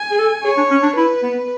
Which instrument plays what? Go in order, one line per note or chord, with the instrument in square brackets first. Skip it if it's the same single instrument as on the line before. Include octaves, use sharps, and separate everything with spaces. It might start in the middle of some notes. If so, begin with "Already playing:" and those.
Already playing: [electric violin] G#5
[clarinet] G#4
A4
[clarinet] G#4 [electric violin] C#5
[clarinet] D4
C#4
D4
[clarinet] E4 [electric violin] B4
[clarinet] B3